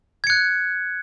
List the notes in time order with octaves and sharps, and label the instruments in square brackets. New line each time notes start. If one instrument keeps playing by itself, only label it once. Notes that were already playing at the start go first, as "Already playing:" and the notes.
[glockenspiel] G#6
C#7
F#6